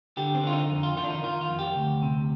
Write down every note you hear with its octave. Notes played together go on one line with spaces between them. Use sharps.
D3 G4
C4
D3 F4
D#4
F2
F4
D#3 F4
D4
D#4
D#3 F4
F4
F2
G4
D2
C3